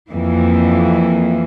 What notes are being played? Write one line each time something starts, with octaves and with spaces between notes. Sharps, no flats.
F2 E3 A#3